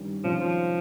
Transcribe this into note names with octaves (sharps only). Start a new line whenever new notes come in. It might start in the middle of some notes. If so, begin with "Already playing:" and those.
Already playing: G2 D#3 G3 C#4
C3 D#3 F3 G#3 C#4 F4
F3